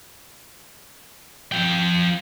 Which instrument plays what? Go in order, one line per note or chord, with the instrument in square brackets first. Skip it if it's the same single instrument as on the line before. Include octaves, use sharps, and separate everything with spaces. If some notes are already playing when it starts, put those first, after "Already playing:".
[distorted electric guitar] F3 G5